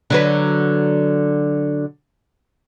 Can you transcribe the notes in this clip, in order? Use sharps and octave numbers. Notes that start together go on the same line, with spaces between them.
D3 F#3 B4